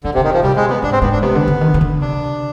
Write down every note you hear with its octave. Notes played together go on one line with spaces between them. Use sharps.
D3 F3
C3
D3
B2 D#3
C3 F3
C3 G3
B2 G#3
C3 B3
G#2 D4
C4
G#2 B3
D4
C3 B3
D3
D3
D#3
D#3
D3
C3 D4